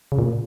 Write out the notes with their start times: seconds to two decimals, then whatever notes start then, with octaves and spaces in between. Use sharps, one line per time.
0.12 C#3
0.19 A#2